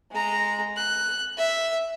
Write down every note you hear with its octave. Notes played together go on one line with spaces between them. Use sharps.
G#3 A#5
F#6
E5